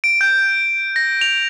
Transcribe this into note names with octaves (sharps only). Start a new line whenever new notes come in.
D7
G6
A#6
F7